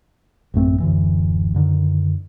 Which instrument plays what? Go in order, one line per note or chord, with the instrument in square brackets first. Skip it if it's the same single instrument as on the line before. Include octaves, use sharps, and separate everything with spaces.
[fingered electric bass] A1 F#2 A3 C4
D1 F#2 D3 E3
F#2 D3 D#3